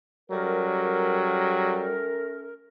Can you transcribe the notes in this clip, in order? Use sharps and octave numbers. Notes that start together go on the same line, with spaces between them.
F#3 G3 A3 C#4 A#4